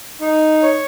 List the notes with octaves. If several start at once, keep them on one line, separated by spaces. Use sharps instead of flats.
D#4
C#5